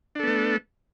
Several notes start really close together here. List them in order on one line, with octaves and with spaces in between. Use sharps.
D4 A4 B3 A3